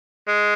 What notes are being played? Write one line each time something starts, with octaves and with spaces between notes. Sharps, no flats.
G#3